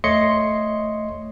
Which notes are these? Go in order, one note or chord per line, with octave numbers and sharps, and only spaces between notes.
A3 C#5 D#5 C6 C#7